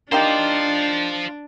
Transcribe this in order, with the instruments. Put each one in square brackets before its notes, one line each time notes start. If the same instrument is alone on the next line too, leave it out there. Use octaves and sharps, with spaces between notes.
[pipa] A#3 D#4 G4 [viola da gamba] D4 [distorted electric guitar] F4 C5